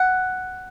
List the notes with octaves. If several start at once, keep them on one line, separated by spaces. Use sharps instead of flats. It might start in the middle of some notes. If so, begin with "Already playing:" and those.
Already playing: F#5